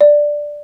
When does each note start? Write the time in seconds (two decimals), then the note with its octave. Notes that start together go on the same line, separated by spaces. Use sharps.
0.01 D5